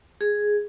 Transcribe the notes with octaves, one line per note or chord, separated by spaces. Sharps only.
G#4